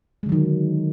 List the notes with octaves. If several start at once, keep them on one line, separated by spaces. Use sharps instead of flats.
D3 D#3 F#3 G#3